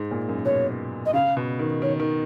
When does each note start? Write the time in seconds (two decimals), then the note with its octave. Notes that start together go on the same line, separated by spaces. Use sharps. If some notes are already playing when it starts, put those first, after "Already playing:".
Already playing: G#2
0.11 A#2
0.29 F#2
0.45 B2 C#5
1.06 D#5
1.14 C#3 F5
1.37 B2
1.59 D#3
1.82 D#3 C#5
2.00 D#3